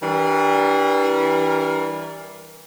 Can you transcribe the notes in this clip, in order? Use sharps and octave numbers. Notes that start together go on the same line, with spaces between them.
E3 G3 D4 A#4